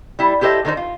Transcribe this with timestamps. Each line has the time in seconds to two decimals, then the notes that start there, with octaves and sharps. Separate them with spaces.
0.19 G3 E4
0.41 E4 G4 A4 C5 D#5 E5
0.65 D3 D#3 D#4 A#4 C5
0.77 F4